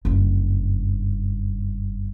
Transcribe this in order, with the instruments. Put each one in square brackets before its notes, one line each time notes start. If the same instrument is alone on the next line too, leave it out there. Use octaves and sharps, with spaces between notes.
[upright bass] F#1 G2